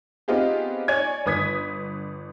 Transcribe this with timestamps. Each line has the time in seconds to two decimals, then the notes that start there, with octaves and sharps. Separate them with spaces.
0.28 B3 C4 D#4 F4 G4 G#4
0.88 C#5 D5 G#5 G#6
1.26 G1 B4 D#6 G#6 B6